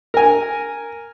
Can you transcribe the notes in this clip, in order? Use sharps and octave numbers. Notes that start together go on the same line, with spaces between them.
A#4 G#5